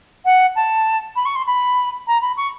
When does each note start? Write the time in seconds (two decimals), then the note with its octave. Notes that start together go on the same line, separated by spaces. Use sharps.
0.25 F#5
0.56 A5
1.16 B5
1.25 C#6
1.35 C6
1.47 B5
2.07 A#5
2.21 B5
2.37 C#6